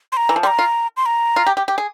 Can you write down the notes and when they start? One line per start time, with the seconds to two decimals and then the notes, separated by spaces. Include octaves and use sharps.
0.12 C6
0.17 A#5
0.29 E3
0.36 F3
0.43 G3 C6
0.47 A#5
0.59 F4
0.97 C6
1.06 A#5
1.36 F4
1.46 G4
1.57 G4
1.68 G4
1.78 G#4